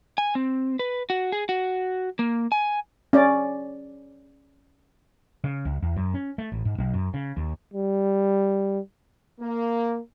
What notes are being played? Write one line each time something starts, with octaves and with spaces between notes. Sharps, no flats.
G#5
C4
B4
F#4
G#4
F#4
A#3
G#5
C#4 D5
C#3
C#2
E2
F#2
C#4
A3
A1
G#2
B1
F#2
C#3
D#2
G3
A#3